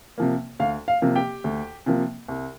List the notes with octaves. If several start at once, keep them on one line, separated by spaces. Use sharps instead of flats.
C3 F3 A#3
D2 F5
F5
C3 F3 A#3
G4 G5
D2
C3 F3 A#3
C2